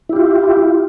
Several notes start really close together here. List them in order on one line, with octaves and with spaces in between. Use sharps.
E4 G4 F4